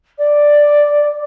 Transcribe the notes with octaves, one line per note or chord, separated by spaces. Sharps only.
D5